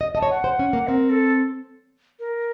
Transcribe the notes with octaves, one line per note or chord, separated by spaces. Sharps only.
D#5
D#5 A5
C#5
F#5
C5
C#4
A#3
C4 A#4
A4
A#4